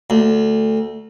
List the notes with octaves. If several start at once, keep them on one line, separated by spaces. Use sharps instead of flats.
D2